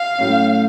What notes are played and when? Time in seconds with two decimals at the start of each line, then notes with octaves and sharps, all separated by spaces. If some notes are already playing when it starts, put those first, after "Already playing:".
Already playing: F5
0.18 A2 F#3 A3 C#4